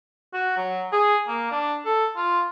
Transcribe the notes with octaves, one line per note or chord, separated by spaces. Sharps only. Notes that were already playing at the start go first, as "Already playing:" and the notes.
F#4
F#3
G#4
A#3
D4
A4
F4